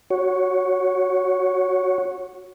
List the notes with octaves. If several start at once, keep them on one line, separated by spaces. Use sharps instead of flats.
F#4 C#5